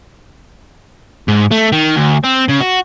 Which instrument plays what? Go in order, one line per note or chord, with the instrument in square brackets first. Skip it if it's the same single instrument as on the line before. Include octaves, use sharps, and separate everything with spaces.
[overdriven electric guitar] G#2
A3
D#3
D2
C4
C#3
F#4